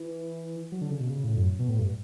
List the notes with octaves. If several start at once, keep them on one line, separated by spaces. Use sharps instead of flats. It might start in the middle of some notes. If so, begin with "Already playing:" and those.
Already playing: E3
F#3
D3
C#3
B2
C#3
A2
F#2
B2
A2
G2